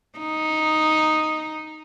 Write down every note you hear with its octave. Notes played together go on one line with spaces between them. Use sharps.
D#4